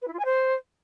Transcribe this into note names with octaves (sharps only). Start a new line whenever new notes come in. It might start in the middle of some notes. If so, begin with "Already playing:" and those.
B4
E4
F4
G#5
C5